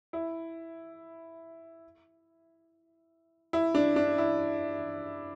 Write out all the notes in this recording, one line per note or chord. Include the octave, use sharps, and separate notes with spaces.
E4
E4
D4
D4
E4